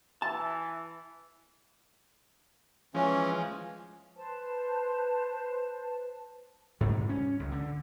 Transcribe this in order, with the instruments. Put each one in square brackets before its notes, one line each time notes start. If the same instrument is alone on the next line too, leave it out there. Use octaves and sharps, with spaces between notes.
[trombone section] E3 [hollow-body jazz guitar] A5
[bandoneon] E3 C#4 [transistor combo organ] F3 G#3
[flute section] B4 C5 A5
[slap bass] G#2 C3 G3
C#4
C#2
D3